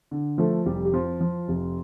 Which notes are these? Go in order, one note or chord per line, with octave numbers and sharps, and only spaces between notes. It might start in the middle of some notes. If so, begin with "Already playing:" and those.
D3
F3 A3 A4
F1 G3 G4
G4
F2 F3 F4
F3
F1